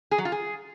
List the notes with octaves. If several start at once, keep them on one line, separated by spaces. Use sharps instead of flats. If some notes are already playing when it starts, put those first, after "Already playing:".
G#4
F#3
F4
G#4